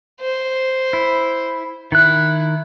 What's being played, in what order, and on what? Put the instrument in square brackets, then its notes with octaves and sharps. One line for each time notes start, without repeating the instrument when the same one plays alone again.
[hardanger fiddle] C5
[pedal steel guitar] E4
[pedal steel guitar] D#3 F#6 [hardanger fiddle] E4